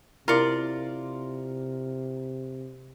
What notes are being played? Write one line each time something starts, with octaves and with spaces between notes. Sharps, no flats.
C3 E4 F4 A#4 D5 C#7